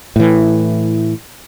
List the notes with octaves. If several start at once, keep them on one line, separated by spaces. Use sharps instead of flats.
A2 E3